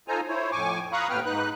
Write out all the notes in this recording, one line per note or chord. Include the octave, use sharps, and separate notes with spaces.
D#4 F4 A4 C5 G#5 A#5
E4 C5 C#5
F2 A2 G#5 C#6 D6
F5 A#5 B5 C#6 D#6 F#6
D#2 A2 B3 B4 G5 F6
G#2 D#4 B4 F#6